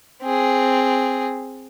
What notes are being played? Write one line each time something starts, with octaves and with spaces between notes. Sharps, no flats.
C4 G#4